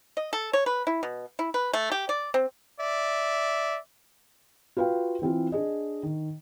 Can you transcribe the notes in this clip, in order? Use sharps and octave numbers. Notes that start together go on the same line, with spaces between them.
D#5
A4
C#5
B4
E4
B2
E4
B4
A3
G4
D5
C4
D5 E5
F4 F#4 B4 F5 G5
E3 C4 E4 F4
D4 G#4 D#5
D#3